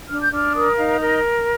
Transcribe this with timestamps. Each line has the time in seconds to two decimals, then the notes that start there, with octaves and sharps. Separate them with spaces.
0.09 D4 F6
0.21 G6
0.32 D4 F6
0.54 A#4 D#6
0.77 D#4 F5
1.00 A#4 D#5